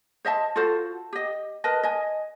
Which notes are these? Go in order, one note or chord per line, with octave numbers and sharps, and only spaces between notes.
C5 D#5 E5 A5
F4 F#4 A4 C5
G4 D#5
A#4 B4 D#5 A5
D#5 G#5